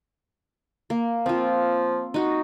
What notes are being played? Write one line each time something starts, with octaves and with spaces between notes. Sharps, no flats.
A#3
F3 C4 F4
D#4 F#4